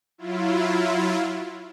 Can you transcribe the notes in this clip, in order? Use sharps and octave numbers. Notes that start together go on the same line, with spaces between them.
F#3 E4 F4